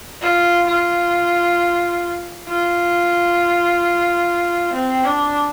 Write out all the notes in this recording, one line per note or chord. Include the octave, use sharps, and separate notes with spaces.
F4
F4
F4
C4
D4